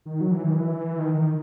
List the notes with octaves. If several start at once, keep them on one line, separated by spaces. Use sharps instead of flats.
D#3
F#3
E3
D#3
E3
D#3
D#3